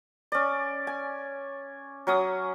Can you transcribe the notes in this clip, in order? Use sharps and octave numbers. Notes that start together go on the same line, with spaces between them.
C#4 D5
G#5
F#3 C#4 D#6